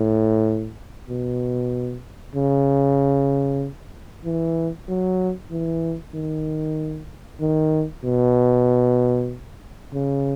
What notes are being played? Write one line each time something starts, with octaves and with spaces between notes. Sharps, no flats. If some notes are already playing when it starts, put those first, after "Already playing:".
Already playing: A2
B2
C#3
E3
F#3
E3
D#3
D#3
B2
C#3